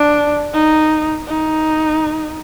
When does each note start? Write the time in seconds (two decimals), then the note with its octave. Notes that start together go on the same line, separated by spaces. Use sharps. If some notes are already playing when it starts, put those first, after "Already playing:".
Already playing: D4
0.53 D#4
1.27 D#4